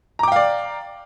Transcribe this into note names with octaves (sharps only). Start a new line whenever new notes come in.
D5 F5 G5 A#5 D6